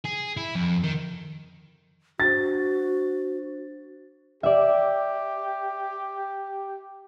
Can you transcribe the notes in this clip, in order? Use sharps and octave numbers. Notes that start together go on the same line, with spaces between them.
G#4
E4
F2
D#3
D4 F#4 C5 A6
G4 D5 E5